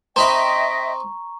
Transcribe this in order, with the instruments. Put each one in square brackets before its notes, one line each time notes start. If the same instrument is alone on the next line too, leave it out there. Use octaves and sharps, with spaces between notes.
[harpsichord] C4 D#4 B5 [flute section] D#5 E5 G5 [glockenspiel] A#5 C#6